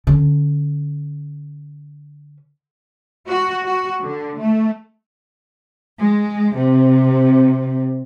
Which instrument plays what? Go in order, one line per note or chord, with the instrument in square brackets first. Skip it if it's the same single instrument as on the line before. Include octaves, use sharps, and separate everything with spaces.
[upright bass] D3 C#4
[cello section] F#4
F#4
D3
A3
[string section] G#3
C3